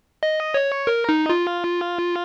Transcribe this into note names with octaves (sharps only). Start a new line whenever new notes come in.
D#5
C#5
A#4
D#4
F4